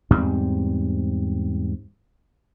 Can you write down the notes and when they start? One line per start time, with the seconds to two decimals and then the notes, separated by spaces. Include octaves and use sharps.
0.11 E2 G#2 G3 C4